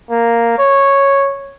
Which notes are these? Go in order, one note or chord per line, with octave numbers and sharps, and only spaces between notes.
A#3
C#5